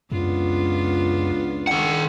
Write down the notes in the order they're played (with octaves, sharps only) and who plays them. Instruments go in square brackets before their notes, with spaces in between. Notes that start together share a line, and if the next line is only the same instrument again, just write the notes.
[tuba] C#2 [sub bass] F#2 [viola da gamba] B3 D4 F4
[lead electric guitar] D#3 F#5